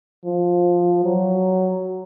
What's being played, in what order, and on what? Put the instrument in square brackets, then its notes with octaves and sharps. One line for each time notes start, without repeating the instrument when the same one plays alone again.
[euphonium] F3
F#3